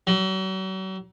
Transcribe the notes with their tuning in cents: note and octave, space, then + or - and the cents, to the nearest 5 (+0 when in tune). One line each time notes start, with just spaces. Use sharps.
F#3 +40